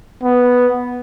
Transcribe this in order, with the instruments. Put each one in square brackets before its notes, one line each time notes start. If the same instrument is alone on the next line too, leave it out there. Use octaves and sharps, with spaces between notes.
[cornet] B3